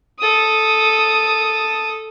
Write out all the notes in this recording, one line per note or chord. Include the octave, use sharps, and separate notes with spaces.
A4 D#6